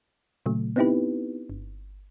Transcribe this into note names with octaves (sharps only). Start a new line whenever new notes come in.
A#2 C#3 F#3 A3
B3 C4 D#4 E4 G4 B4
G1